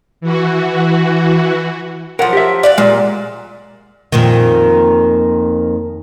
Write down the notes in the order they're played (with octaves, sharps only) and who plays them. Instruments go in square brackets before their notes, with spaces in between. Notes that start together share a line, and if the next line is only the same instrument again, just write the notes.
[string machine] E3 F#4
[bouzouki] F3 F#3 [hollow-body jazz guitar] A#4 F#5
[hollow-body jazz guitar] G4 E5
[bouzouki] D5 F5 F#5
[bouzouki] A#2 [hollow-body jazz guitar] G#3
[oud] F2 A#2 D#3